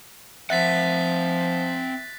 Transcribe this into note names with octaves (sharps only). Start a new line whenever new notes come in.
F3 C4 E5 F#5 F#6 A6 B6